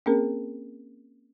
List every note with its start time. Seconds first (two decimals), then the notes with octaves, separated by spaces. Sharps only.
0.06 A#3 C4 C#4 G#4 A#4